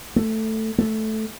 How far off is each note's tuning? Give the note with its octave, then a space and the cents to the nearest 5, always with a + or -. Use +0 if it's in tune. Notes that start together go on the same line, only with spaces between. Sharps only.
A3 +5
A3 -10